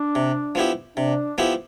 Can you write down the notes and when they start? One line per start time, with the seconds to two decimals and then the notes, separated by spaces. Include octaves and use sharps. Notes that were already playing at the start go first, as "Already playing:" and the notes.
Already playing: D4
0.15 C3
0.55 F3 B3 E4 G4
0.97 C3 D4
1.38 F3 B3 E4 G4